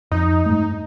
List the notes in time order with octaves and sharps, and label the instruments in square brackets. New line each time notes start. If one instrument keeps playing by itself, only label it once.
[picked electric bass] F2 [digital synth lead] D#4
[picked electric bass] G2 G#3 A3